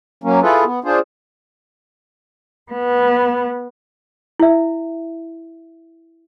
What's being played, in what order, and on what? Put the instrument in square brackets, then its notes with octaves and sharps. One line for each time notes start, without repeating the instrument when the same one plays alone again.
[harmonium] F#3 A#3 C#4
E4 F4 G#4 A4 B4
B3
D4 F4 G#4 C5
[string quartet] B3
[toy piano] E4 E5